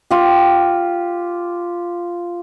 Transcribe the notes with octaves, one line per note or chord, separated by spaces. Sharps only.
F4 G4